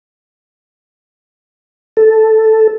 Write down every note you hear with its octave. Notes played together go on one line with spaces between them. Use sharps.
A4